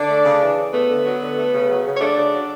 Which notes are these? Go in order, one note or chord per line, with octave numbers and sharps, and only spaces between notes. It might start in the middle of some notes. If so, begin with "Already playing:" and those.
Already playing: D3 D4 D5
A3
C#3
E3
C#3
A3 B3 B4
D3
F#3
D3
A3
C#3
F#3
C#3
C#5
A3 D4 D5
C#3
F#3